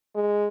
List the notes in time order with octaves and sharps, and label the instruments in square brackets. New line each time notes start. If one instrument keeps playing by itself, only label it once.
[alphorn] G#3